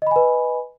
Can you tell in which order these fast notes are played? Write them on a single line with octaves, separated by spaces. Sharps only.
D#5 B5 G#5 B4